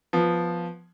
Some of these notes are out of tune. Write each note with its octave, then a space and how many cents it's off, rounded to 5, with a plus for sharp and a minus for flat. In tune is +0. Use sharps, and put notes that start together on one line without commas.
F3 +0 B3 +0